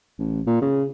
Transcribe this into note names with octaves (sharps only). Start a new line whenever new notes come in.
A1
A#2
C#3